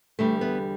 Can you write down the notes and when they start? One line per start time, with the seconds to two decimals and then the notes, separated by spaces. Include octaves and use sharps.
0.19 E2 D3 G3 A3
0.41 B3